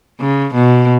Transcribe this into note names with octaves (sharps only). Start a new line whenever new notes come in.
C#3
B2